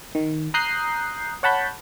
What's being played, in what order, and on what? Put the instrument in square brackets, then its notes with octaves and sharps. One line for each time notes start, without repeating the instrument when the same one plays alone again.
[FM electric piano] D#3
A#5 D#6 F#6 G6 C7
C#5 F#5 A5 B5 G6